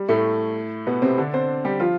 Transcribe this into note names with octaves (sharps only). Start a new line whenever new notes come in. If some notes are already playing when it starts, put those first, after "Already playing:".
Already playing: G3
A2 A3
B2 B3
C3 C4
D3 D4
C4 C5
G3 G4
F3 F4